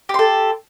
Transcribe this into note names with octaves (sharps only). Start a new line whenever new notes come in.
G4 A4 C6